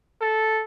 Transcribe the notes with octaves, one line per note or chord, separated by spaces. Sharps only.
A4